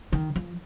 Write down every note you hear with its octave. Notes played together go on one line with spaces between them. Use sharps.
D#3
F3